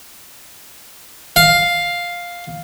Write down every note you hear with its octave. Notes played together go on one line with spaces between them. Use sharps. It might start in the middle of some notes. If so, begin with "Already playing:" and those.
F5